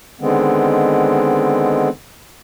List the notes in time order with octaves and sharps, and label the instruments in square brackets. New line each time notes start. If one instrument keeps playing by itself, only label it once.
[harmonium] D3 D#3 G#3 B3 C4